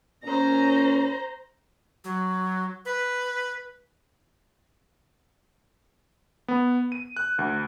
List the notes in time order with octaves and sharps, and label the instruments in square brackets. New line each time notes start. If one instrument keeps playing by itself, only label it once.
[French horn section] A#2 C#4 [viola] C5 A#5
[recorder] F#3
B4
[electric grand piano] B3
D#7
F#6
D2